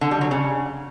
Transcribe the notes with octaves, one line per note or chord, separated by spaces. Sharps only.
D3
G3
F#3
C#3